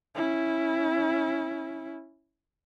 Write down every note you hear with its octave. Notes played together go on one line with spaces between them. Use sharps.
C#4 E4